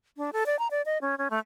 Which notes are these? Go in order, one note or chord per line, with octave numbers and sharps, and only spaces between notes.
D4
A4
D5
A#5
D5
D#5
C#4
C#4
A3